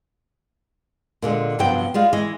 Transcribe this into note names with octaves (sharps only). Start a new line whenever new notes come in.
A#2 D3 G#3
G2 C3 F3 F#3 B3 G5
G3 G#3 F4 F5
E3 G#3 D#5